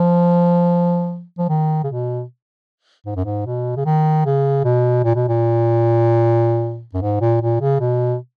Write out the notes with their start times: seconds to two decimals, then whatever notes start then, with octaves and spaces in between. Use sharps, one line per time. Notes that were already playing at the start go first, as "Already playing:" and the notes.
Already playing: F3
1.38 F3
1.49 D#3
1.84 C#3
1.87 B2
3.06 G#2
3.16 F#2
3.25 G#2
3.45 B2
3.76 C#3
3.85 D#3
4.25 C#3
4.64 B2
5.04 A#2
5.15 B2
5.28 A#2
6.94 F#2
7.02 G#2
7.21 A#2
7.41 A#2
7.61 C#3
7.80 B2